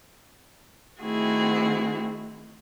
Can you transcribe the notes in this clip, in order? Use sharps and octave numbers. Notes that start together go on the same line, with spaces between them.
D#3 A3 C4 E4 F#4 G#4